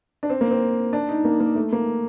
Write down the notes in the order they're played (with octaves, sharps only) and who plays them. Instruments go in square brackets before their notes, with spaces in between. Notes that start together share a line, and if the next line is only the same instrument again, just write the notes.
[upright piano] D4
C4
A#3
C4
D4
D#4
A#3
A#3
A3
A#3